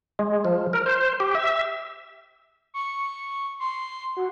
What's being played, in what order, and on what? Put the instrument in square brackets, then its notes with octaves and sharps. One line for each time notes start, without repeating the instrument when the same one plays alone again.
[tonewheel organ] G#3
F3
A#4
C5
G4
E5
[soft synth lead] C#6
C6
F#4